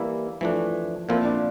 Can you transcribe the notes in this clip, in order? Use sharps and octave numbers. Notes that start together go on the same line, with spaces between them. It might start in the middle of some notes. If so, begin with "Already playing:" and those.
Already playing: E3 G3 A#3 E4
E3 F3 A3 D4
A#2 F3 A#3 C4 E4
D4